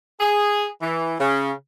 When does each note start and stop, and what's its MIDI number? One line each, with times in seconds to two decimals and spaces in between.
0.20 0.67 68
0.81 1.14 52
1.20 1.52 49